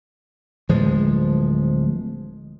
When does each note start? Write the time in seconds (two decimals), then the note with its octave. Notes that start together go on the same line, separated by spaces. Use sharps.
0.69 D1 F3 G#3